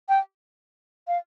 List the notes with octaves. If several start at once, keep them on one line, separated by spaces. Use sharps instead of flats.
G5
F5